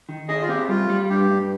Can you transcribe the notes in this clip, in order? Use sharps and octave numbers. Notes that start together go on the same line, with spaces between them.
D#3
G#4 D#5
F4
C4 G4
G3 F4
G3
G2 G4
G2